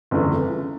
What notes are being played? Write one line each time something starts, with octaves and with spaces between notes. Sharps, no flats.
G1 F2 C#3 E3 A3